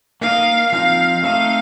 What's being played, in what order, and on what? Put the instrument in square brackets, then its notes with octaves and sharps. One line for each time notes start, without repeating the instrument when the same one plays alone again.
[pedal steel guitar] A#3 D#4 A#4 D#5 [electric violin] F5
[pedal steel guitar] F3 C4 D#4 [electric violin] F5
[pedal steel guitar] A3 C4 D#4 A4 D#5 [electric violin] F5